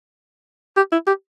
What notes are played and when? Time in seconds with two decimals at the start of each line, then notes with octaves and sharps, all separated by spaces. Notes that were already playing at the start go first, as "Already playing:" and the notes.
0.76 G4
0.92 E4
1.07 G4